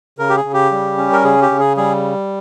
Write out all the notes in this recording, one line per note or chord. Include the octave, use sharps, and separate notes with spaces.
C#3 A#4
G4
G#4
C#3
G4
G3
C#4
A#4
C#3 G#4
G4
C#3
G#4
G3 G#4